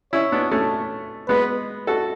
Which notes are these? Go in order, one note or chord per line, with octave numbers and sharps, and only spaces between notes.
C#4 E4 C#5
B3 D4
A3 C#4
G#3 B3 B4
F#4 A4